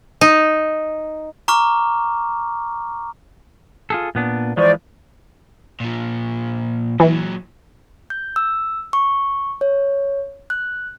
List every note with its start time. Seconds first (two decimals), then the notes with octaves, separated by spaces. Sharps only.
0.21 D#4
1.48 A#5 C#6 D6 F6
3.90 F4 G#4 A4
4.15 A#2 B3 D4
4.57 E3 F3 G#3 C5 D5 C#6
5.80 A#2 F3
7.00 A#2 E3 F#3
8.10 G6
8.36 E6
8.93 C#6
9.61 C#5
10.50 F#6